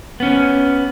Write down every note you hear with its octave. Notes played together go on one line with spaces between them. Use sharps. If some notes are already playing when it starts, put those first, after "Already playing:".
B3 C#4